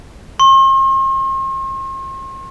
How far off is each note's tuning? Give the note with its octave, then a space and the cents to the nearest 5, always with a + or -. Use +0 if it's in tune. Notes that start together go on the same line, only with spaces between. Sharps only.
C6 +45